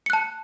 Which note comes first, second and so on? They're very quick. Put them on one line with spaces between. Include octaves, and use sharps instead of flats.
C#7 F#6 A5